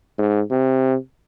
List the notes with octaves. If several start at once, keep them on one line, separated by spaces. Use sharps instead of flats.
G#2
C3